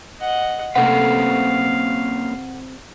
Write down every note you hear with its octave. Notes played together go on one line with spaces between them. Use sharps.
D#5 F#5
C3 A3 A#3 C#4 B4 F5 F#5